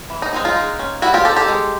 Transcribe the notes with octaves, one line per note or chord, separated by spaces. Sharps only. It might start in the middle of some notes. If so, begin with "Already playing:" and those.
E3
D#4
G#3 C4 D#4
D#4 F4
G#3
C#4
G3 E4 F#4
F4 G4
C4 D#4 G4 A4
G4 A4
G#3